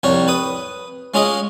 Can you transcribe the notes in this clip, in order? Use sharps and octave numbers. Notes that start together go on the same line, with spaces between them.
C2 F2 G3 A#4 C#5
B4 D#6
G#3 C#4 F4 G#4 D#5